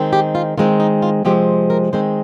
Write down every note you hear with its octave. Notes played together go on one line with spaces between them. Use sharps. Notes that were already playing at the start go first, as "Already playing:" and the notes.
Already playing: D#3 G#3 C4
G4
F4
D#3 G#3 C4 F4
D#4
F4
C3 F3 G#3 C4 G4
A#4
D#3 G#3 C4 C5